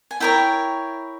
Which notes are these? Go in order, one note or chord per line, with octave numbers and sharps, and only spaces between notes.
G#5
E4 A#4 C#5 G5